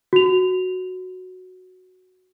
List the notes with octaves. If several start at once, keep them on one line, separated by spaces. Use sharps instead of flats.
F#4 F7